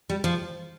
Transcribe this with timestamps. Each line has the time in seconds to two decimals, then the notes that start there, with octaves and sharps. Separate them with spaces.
0.10 G3
0.24 F3